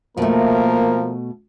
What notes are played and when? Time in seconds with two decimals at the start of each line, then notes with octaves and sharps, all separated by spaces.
0.18 B2 F3 A3 A#3 A#4